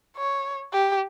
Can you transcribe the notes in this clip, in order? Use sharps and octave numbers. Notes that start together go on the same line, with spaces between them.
C#5
G4